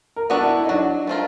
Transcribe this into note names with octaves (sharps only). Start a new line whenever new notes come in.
A#4
B3 D4 F#4 A4
E4
D#4
F#3 D4
A3 C4 F4 A#4